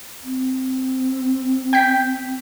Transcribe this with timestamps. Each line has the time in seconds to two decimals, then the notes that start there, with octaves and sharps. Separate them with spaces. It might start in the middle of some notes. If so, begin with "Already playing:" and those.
0.23 C4
1.73 G5 G6 B6